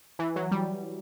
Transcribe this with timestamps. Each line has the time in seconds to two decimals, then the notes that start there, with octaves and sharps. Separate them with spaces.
0.19 E3
0.36 F#3
0.51 G3